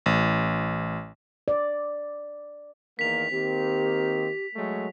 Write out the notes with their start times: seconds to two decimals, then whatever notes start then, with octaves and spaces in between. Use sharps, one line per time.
0.06 A1
1.48 D5
2.99 E2 D#3 A#3 B6 F7
3.32 D#3 A#3 C4 G4
4.55 F#3 G#3 A3